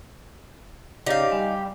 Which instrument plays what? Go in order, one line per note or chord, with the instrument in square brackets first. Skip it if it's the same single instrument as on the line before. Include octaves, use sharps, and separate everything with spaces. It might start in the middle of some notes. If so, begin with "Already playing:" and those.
[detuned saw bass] C#3 [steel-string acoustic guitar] D#4 F5 [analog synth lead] G4 [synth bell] C#5 D5
[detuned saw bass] G3 [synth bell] G#5